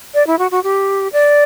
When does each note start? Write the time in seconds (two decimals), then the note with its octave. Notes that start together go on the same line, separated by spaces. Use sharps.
0.14 D5
0.27 E4
0.39 F#4
0.51 F#4
0.64 G4
1.13 D5